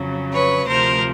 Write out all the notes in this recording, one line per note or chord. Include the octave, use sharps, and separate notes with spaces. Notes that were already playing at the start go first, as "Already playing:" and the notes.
Already playing: F2 C#3 F#3
B4 C#5
D2 C3 F3 A#4 C5